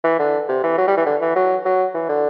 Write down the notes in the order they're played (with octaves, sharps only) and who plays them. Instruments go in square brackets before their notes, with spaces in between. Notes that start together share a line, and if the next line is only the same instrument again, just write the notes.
[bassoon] E3
D3
C3
E3
F#3
G3
E3
D3
E3
F#3
F#3
E3
D3